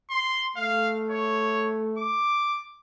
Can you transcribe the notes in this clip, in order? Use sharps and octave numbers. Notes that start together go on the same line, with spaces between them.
C6
A3 F5
C#5
D6